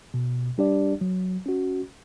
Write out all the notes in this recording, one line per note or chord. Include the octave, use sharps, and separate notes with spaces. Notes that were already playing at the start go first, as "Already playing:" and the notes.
B2
G3 D4 G4 D5
F#3
C#4 F#4